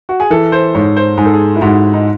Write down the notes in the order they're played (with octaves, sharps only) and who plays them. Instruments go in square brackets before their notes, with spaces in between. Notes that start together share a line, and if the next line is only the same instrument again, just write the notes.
[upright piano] F#4
G#4
[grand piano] E3 [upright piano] A4
[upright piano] C5
[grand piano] G#2 [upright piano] C#5
[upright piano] C5
[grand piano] G#2 [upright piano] G#4
[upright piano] A4
G#4
E4
[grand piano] G#2 [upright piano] F#4
[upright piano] D#4